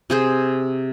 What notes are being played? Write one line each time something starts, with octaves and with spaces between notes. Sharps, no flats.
C3 G#4 C5